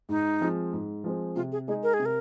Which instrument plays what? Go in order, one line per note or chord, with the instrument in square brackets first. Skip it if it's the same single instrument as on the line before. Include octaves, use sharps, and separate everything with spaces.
[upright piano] G#2 [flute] D#4
[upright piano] F3 G#3 C4
G#2
F3 G#3 C4
[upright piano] C3 [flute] F4
[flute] G#4
[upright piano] G#3 D#4 [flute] G#4
[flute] A#4
G#4
[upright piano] C3
[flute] A#4